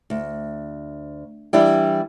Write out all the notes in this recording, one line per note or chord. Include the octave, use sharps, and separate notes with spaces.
D2
E3 G3 D4 E4 G4